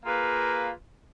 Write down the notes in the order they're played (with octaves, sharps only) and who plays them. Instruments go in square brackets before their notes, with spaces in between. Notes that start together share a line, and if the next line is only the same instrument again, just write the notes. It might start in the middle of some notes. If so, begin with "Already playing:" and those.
[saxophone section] A#3 F4 G#4 B4